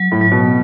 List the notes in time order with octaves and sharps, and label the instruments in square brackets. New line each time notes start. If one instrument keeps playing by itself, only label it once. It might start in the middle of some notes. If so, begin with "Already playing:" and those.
Already playing: [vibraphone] F#3
[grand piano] A2
[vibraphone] F#3
[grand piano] B2